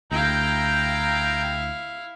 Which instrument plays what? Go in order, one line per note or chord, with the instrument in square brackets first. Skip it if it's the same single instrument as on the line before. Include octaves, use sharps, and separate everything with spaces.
[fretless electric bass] D2 [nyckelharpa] E4 F5 [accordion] G5 A#5 G6